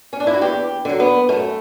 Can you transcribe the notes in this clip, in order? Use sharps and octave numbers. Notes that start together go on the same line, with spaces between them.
C#4
D4
E4
F#4
E2 G4
D3 F#3
B3
F#2 A3